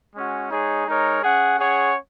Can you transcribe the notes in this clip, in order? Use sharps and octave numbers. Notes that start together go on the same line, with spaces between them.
G#3 C#4 F#4
G#3 D#4 G#4 C#5
G#3 D#4 A#4 C#5
C#4 G#4 F#5
C#4 G#4 C#5 F#5